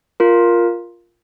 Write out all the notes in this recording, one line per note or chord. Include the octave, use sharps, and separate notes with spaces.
F4 A#4